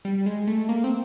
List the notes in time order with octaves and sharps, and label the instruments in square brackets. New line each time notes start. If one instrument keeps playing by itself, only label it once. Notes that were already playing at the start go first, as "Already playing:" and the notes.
[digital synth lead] G3
G#3
A3
A#3
C4